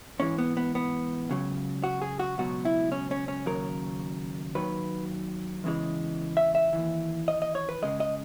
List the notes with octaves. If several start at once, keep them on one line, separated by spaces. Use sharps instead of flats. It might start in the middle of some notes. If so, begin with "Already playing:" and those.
G#2 E3 G#3 C#4
B3
B3
B3
C#2 C#3 F#3
F#4
G#4
F#4
C#2 B2 F#3 F#4
E4
C#4
C#4
C#4
D#2 C#3 F#3 A#4
D#2 D#3 F#3 B4
E2 C#3 E3 G#3
E5
E5
D#2 C#3 E3
D#5
D#5
C#5
B4
C#2 C#3 G#3 D#5
D#5